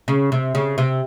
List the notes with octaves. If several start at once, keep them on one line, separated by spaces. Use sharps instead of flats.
C#3
C3
C#3
C3